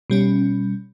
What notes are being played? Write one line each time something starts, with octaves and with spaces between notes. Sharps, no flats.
B2 G3 C#4